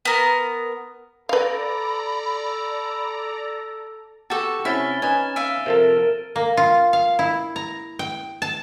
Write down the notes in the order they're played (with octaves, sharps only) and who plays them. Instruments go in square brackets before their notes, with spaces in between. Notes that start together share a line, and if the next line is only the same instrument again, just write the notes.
[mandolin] B3 A#4
[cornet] A4 [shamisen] B4 F5 [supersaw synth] D5 A#5 [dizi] B5
[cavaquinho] F#4 A4 [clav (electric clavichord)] G4 A5
[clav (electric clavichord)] C3 C#4 [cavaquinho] E4 [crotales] F6 A6 G7
[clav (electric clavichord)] C#4 D#4 B4 [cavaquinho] G#5 [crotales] F6 A6 E7
[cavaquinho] E5 F5 [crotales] D7 D#7
[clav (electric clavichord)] C3 F3 A4 [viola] A#4
[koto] A#3
F4
F5
E4
A#5
G5
A5